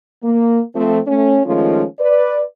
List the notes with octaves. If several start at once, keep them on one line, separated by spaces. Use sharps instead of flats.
A#3
F3 A3 C4
A3 C#4
D#3 F3 G#3 A3 C#4 F4
B4 D5